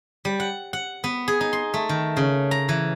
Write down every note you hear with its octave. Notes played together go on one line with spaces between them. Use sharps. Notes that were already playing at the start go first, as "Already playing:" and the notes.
G3
F#5
F#5
B3
G#4
D#4
C6
A3
D#3
C#3
A#5
E3